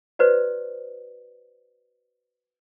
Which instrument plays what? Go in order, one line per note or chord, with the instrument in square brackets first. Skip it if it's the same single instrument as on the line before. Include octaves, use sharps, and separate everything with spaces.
[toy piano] F#4 B4 C5 D5